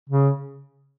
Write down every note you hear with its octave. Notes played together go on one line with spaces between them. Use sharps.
C#3